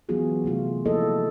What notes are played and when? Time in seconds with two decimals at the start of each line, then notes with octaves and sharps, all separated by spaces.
0.09 E3 F#3 B3 F4 F#4 G#4
0.44 C3 A3 F4 F#4
0.85 F3 A#3 E4 A4 D#5